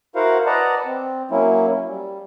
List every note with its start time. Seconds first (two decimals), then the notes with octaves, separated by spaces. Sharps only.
0.16 E4 F#4 A#4 C5 F5 F#5
0.46 B4 D5 D#5 F#5 A5 A#5
0.86 C4
1.31 F#3 A#3 C#4 E4
1.88 G3